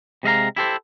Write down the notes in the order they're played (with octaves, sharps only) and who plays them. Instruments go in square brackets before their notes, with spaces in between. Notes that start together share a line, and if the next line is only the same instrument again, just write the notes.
[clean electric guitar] C3 G#3 D#5 F5 A#5
E4 G4 A4 C5